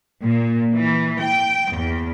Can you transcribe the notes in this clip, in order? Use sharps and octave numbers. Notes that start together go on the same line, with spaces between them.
A#2
E3
G5
E2